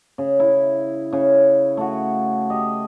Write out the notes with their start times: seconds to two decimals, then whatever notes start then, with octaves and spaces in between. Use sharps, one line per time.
0.18 C#3
0.40 E4
1.13 C#3
1.77 A3 F#4
2.50 G4 D#5